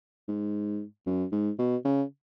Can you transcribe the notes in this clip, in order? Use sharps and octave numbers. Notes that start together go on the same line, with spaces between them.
G#2
F#2
G#2
B2
C#3